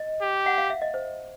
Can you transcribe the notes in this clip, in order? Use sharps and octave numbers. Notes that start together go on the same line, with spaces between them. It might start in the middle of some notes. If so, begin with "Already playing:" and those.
Already playing: D#5
G4
F#5
F5
E5
D#5
C5